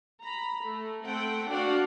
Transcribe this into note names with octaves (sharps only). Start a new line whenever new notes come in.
A#5 B5
A3
A3 C4 F#5 G5
D4 F#4 D5 F5 F#5